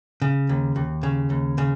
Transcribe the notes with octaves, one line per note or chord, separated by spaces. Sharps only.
C#3
D#2
D#2
C#3
D#2
C#3